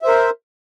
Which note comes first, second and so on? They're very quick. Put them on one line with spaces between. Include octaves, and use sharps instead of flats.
E5 C5 A#4